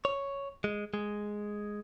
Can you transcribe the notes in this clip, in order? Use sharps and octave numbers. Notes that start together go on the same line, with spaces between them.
C#5
G#3
G#3